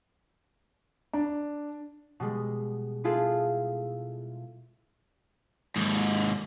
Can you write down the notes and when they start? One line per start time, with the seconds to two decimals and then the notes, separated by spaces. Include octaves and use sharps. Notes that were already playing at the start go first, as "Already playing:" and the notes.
1.13 D4
2.20 B2 G3 G#3
3.04 B3 E4 F4 G#4 A4
5.76 D#2 G#2